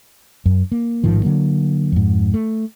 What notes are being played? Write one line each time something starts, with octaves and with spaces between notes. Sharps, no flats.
F#2
A#3
A1 G#2 D#3 F3
D3 F#3 A#3
F2 G#2
A3